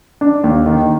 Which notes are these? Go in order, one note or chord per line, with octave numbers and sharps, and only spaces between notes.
D4
D#2
D#3